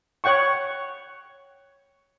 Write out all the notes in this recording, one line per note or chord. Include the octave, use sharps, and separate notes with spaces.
C#5 F#5 G5 C#6